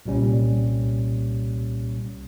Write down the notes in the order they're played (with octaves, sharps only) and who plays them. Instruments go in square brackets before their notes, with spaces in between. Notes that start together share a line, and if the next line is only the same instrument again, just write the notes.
[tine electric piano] C2 A#2 G3 C#4